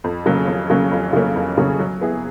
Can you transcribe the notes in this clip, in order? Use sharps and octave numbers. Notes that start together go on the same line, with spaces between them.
F2
C#3 F#3 A#3 C#4
F2
C#3 F#3 A#3 C#4
F2
C#3 F#3 A#3 C#4
F2
C#3 F#3 A#3 C#4
F#3
B3 E4 G#4